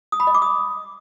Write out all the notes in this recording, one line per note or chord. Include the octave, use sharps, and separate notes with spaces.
D#6
B5
D#5
D6
D#6